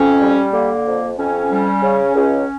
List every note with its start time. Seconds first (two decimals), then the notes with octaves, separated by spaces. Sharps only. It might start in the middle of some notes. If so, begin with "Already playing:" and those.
Already playing: F2 C#4
0.21 G3
0.53 D3 A#3
0.86 F2
1.18 F2 C#4
1.50 G3
1.83 C#3
2.15 C#2